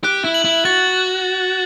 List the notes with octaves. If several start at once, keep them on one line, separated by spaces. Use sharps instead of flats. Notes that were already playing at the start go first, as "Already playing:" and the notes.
G4 F#6
E4
F#7
E4
F#4 A6